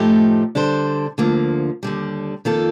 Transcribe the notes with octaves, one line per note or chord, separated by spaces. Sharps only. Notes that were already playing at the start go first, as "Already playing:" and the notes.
Already playing: A2 F3 A3 D#4 G4
D3 G3 D4 A4 C5
D2 D3 F3 A#3
D#2 D3 G3
F2 D#3 A#3 F4 A4